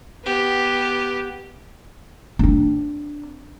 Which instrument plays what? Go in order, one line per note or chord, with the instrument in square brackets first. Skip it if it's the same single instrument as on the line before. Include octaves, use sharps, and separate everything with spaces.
[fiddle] B3 G4
[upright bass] C4 D4